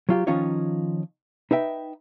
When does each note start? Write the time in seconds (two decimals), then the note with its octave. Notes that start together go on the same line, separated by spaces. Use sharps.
0.09 F#3 F4 G4
0.27 D#3 F3 C#4 D#4 F4 C#5
1.51 D#4 B4 E5 G5